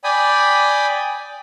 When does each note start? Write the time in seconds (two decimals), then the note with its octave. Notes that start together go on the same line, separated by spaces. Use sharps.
0.04 D5 G5 G#5 B5 D#6